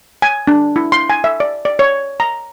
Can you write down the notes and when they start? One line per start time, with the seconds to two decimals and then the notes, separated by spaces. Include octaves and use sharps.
0.22 G#5
0.47 D4
0.76 E4
0.92 C6
1.10 G#5
1.24 E5
1.40 D5
1.65 D5
1.79 C#5
2.20 A#5